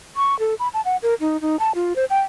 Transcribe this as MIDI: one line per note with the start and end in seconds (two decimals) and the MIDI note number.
0.17 0.37 85
0.39 0.54 69
0.59 0.68 83
0.74 0.81 81
0.85 0.97 78
1.03 1.14 70
1.20 1.40 63
1.41 1.59 63
1.59 1.72 81
1.75 1.96 65
1.96 2.05 72
2.10 2.20 79